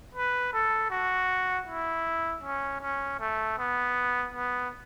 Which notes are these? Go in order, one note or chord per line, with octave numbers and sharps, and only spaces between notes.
B4
A4
F#4
E4
C#4
C#4
A3
B3
B3